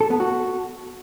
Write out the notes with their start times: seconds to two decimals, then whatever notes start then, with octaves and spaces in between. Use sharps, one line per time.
0.01 A4
0.10 B3
0.20 F#4